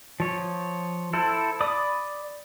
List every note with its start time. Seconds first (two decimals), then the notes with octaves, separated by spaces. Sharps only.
0.20 F3 C#5
1.13 E4 A4 C5
1.61 D5 B5 D6 D#6